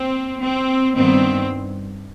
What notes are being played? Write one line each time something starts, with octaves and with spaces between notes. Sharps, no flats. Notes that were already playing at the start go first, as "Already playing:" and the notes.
Already playing: C4
C4
G2 D#3 B3 C4